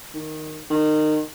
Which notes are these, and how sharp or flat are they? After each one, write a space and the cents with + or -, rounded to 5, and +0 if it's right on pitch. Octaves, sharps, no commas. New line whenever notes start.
D#3 -5
D#3 -25